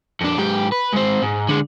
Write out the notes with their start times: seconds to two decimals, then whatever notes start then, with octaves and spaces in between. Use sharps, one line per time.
0.21 F2 D4
0.38 G#2 G4
0.72 B4
0.93 G#2 C4
1.22 G#2
1.48 D3 G#3